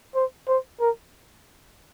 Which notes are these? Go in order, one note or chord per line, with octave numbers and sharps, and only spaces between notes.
C5
C5
A#4